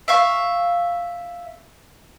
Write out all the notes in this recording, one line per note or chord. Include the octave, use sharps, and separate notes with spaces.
E5 F5 C#6